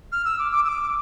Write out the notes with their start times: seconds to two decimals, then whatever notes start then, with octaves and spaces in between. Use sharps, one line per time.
0.12 F6
0.25 E6
0.39 D6
0.52 D6
0.65 E6
0.69 D6